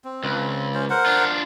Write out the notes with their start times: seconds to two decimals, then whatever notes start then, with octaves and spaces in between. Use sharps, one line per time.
0.04 C4
0.24 C#2
0.74 C#4 C5
0.90 A#4 C5 F#5
1.06 D4 F4